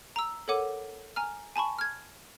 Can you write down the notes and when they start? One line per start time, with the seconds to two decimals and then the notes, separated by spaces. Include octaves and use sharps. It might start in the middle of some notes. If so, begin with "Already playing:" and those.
0.16 A#5 E6
0.48 A4 A#4 C#5 F#5 D6 D#7
1.16 G#5 A#5 F6
1.56 G#5 A5 B5 C#6
1.79 F6 G#6